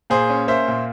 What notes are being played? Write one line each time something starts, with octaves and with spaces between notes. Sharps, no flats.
A#2 G#4 C5
C#4
A#3 C5 E5
A#2